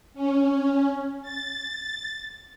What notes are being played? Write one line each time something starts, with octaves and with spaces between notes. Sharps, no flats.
C#4
A6